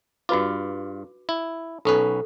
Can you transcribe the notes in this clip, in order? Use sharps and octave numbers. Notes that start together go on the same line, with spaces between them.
G2 F4 F#4 B4 D6
E4
B1 C#4 A4 B4 C#6